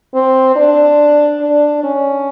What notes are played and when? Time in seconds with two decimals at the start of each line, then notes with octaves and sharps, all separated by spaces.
0.14 C4
0.56 D4
1.41 D4
1.84 C#4